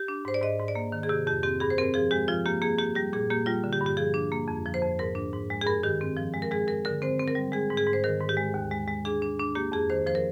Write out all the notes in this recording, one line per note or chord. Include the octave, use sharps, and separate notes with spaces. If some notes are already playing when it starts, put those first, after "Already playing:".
Already playing: G4
D4
G#2 C5
D5
G#2 D#5
G#2
D5
A#3
D#3
G#4
C3 G4
F2 G4
C4 G4
G2 G#4
C5
C4 A#4
F3 G#4
G#3 G4
F3 F4
A#3 G4
A#3 G#4
A#3 G4
G3 G4
A#2 G#4
A#3 G4
G3 F4
D3
G4
G2
G4
F3 G#4
D4
A#3
F2
F3
C5
F2
G#2 A#4
D4
G#2
G#3
G#4
G2 A#4
D#3 G4
C4
F3
G#3
A#4
G#3 G#4
G#3 A#4
D3 A#4
C4 C5
C4
A#4
G3
G#3 G#4
G#2
G#4
G#2
C5
D#3 A#4
G#2
G4
G#3
D#2
G#3
G#3
D4 G#4
D4
D4
A#3 G4
F2 G#4
D#3 C5
F3 C5
A#4